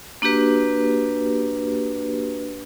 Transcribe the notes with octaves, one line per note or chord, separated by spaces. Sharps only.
A#3 D4 F#4 G4 B4